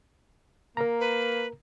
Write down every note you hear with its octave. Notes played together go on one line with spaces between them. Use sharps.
A#3 A#4 A#5
B4